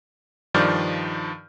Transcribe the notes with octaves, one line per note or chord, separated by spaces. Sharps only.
G2 D#3 F3 D5 F6 G6